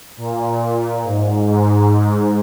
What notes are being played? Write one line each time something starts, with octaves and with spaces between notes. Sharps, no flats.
A#2
G#2
G#2